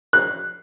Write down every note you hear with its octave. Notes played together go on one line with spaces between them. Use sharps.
F#6